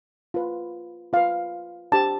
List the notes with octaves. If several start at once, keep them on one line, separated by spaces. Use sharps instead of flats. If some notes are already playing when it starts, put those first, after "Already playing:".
F4 B4
F4 B4 F5
D4 G4 C5 A5